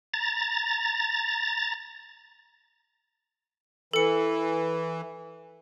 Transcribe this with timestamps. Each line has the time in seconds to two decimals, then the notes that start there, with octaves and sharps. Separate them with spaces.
0.14 A#5 A6
3.94 E3 A4 C#7